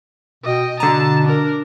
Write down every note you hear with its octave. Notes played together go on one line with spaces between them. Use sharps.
B2 D#5 G5
B2 D3 A5 A#5
D4 A#4